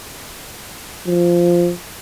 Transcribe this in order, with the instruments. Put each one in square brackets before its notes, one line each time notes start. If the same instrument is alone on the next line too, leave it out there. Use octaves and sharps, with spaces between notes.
[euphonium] F3